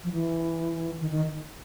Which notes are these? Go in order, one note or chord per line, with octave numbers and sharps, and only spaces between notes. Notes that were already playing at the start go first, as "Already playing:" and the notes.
F3
E3
D#3
D#3